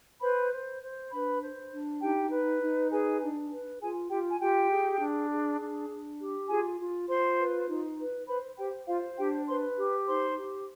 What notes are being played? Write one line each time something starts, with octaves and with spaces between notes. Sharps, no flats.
B4 C5 B5
C5
C5
D4 B4 B5
C5
D4
D#4 G4 G5
B4
D#4
G#4 B4 G#5
D4
B4
F4 G#4 G#5
F4 G4 G5
G#5
F4 G4 G5
G#4
D4
G#4
D4
D4
G4
F4 G#4 G#5
F4
F4 C5 C6
B4
D#4
B4
B4 C5 B5
G4 C5 G5
F4 C5 F5
D4 G4 G5
B4 C5 C6
G4
D#4 C5 C6
G4